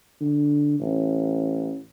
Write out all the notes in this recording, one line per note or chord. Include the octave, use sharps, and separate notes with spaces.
D3
A1